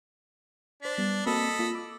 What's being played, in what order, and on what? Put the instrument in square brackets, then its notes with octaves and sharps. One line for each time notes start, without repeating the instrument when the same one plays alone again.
[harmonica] D4 [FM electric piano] C5 B6
[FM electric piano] G3 B3
[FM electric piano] A#3 C4 F#4 [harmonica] A4 D#5 B5
[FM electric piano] A#3 F4 B6
D6 E6